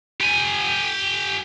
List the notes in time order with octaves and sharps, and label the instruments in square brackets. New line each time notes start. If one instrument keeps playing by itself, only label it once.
[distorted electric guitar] G4 G#5